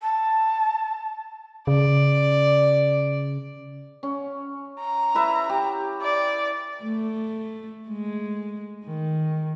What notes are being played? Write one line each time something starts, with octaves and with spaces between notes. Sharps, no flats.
A5
C#3 D5
C#4
A#5
E4 B4 E5
G4
D5
A3
G#3
D#3